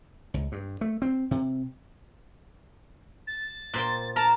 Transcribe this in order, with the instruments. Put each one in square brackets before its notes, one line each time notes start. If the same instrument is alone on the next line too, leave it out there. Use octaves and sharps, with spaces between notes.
[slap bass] C#2
G2
A3
C4
C3
[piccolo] A6
[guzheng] A#2 C5 G5
[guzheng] A#4 A#5 [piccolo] A5